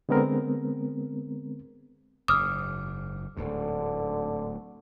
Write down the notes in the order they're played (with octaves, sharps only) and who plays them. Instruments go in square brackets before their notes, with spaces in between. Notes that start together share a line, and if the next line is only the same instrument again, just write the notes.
[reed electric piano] D3 G#3 B3 C4 A#4
[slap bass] F#1 G#2 [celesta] D6 F6 [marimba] D#6
[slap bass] D1 D2 G#2 [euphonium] D3